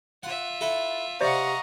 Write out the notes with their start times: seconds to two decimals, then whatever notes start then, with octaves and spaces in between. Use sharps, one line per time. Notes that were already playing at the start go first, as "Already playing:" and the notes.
0.23 F4 E5 F#5
0.61 E4 A4 F#5
1.21 C3 C5 D5 D#5 F5 F#5 A#5 C#6